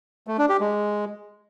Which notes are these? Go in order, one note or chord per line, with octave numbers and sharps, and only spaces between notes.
A3
D4
G4
G#3